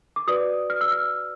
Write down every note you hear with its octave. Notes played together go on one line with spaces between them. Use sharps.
D6
F#4 B4 D5 D#6
F6
E6
F6